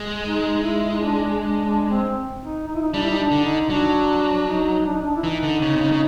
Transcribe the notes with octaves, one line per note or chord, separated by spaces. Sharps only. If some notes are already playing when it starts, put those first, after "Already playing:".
Already playing: G#3
D#4
E4
D#4
D4
D4
D4
C4
D#4
D#4
E4
D#4
G3 D4
E4
D#4
D4
D3
D#4
F#3 D4
D#4
D4
D#4
D4
E4
E3 D#4
D3
C#3
C3
C#3
C#3